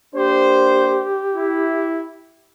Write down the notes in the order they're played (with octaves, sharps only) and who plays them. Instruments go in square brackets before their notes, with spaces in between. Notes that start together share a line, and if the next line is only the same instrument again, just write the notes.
[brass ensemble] A#3 D4 C5 [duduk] G4
[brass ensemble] E4